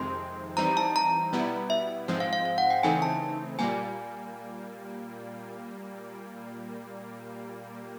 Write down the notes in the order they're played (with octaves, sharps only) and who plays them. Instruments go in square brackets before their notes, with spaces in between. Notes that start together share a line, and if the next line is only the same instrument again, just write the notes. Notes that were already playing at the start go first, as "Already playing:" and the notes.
Already playing: [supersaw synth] F2 C3 D#3 G#3 C4 [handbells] C6
[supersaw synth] E3 G3 C4 D#4 [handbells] A#5
[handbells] A5
A#5
[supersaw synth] B2 G3 B3 E4
[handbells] E5
[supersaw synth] G#2 F3 G#3 C4
[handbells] F5
F5
F5
F#5
G5
[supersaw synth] C#3 E3 A3 C4 D#4 [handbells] G#5
[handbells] A5
[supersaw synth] A#2 G3 A#3 [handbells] G#5